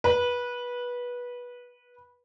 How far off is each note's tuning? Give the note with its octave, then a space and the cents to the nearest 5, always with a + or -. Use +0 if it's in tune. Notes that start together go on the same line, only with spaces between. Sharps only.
B4 -20